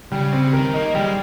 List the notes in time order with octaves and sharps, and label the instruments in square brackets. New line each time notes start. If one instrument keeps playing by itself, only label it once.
[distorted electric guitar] C#3 [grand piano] G3
[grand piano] C4
[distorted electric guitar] D#3 [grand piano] A#4
[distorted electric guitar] A#3 [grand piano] D#4
[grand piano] G3 [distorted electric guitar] G#3